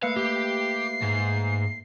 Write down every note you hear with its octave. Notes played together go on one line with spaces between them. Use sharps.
A3 A#3 B4 F5 C#7
G4 C7
G#2